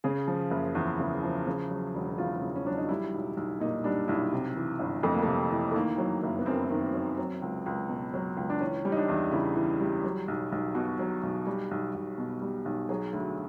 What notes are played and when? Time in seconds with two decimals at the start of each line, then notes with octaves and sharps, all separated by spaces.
0.04 C#3 G#4
0.27 F3
0.51 F#1
0.75 E2
0.99 C#3
1.23 F3
1.47 C#3
1.70 F#3
1.95 E1
2.18 E2 F4
2.41 C#3
2.56 C#4
2.66 F#3 D4
2.78 D#4
2.89 G3 E4
3.14 B1
3.37 B1
3.60 A#2 D#4
3.84 G3 D4
4.08 B1 E4
4.33 C3
4.57 E3
4.79 G1
5.03 F2 A3
5.13 A#3
5.23 C3 A3
5.51 E3
5.71 A3
5.75 D#3 A#3
5.98 F#3
6.23 F#1
6.39 B3
6.46 F#2 C4
6.70 D#3
6.94 F#3
7.18 F#3
7.42 C#2
7.66 C#2
7.89 B2
8.14 F#3
8.37 C#2
8.50 D4
8.61 E3 C#4
8.85 G3
8.92 D#4
8.97 D4
9.08 E2
9.32 C#3 E4
9.56 E3
9.80 G3
10.04 F#3
10.28 B1
10.52 B1
10.75 B2 F#4
10.99 F#3
11.23 B1
11.47 G3
11.71 B1
11.94 B1
12.18 B2
12.42 G3
12.65 B1
12.89 F#3 G#4
13.13 D2